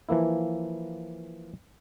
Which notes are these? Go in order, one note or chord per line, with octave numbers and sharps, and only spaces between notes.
E3 F3 A#3 E4